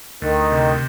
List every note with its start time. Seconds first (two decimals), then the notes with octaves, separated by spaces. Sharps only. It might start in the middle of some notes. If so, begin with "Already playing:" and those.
0.22 D2 D#3
0.52 C3